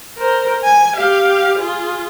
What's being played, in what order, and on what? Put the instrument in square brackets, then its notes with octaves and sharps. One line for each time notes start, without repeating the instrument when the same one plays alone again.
[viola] A#4 C5
G#5
G4 F5
F4 G#4